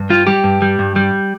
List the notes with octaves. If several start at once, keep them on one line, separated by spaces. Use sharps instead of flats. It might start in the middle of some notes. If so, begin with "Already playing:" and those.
Already playing: G2
G3 F4
G3 G4
G2
G3
G2
G3